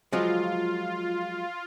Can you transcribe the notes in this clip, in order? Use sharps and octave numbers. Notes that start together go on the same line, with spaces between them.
F3 F#3 G#3 F4